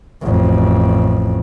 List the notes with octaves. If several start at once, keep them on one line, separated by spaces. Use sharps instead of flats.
A1 F2